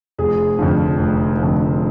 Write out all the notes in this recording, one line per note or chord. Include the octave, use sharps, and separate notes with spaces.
F1 G#4
F2 D3 F3
F1
F2 D3 F3